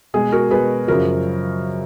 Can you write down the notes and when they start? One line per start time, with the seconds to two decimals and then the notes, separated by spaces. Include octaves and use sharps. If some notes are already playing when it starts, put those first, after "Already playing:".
0.14 B2 G#3 G#4
0.32 F#4 A#4
0.51 B2 G#3 G#4 B4
0.88 F#2 C#3 F3 F#4 A#4